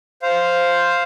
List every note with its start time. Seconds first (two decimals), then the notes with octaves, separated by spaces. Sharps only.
0.22 C5 F5